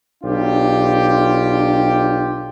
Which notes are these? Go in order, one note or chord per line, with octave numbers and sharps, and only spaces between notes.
B1 D4 F4 G4